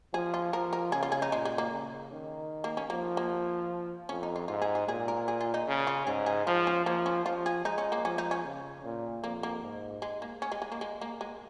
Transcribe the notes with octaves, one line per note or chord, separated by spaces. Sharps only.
F3 G#4
F4
F3 A#4
A#4
C#3 G#4
F4
G#4
D#4
A#2 G#3
G#3
A#3
C#3
D#3
A#3
C#4
F3 A#3
A#3
F2 C#4
D#4
F4
G#2 F4
G#4
G#4
A#2 G#4
A#4
G#4
F4
D#4
C#3
F4
G#2 G#4
G#4
F3 F4
C#4
F3 A#3
C#4
F3 F4
G#4
G#3 D#4
C#4
A#3
F3 C#4
D#4
C#4
C#3
A#2
F2 A#3
A#3
G#2
G#3
A#3
C#4
G#3
G#3
A#3
G#3
A#3
G#3